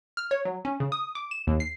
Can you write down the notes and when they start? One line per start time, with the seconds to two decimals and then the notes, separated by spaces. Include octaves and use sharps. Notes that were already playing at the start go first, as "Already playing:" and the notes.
0.17 F6
0.31 C#5
0.45 F#3
0.65 C#4
0.80 C#3
0.92 D#6
1.15 D6
1.31 E7
1.47 D#2
1.60 C7